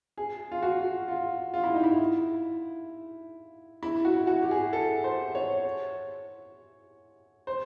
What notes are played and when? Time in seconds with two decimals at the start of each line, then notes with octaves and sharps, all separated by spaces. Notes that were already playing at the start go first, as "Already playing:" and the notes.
0.18 G#4
0.52 F4
0.62 F#4
1.08 F4
1.54 F4
1.64 E4
1.74 D#4
1.84 E4
3.83 E4
4.05 F#4
4.27 F#4
4.43 G4
4.51 G#4
4.73 A4
5.04 C5
5.35 C#5
7.47 C5